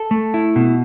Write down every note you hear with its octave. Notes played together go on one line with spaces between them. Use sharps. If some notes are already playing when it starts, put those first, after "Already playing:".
Already playing: A4
A3
E4
B2